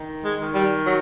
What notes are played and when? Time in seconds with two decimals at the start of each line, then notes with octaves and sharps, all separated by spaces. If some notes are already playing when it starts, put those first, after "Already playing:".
Already playing: D#3
0.24 G#3
0.39 D#3
0.54 G3
0.85 F#3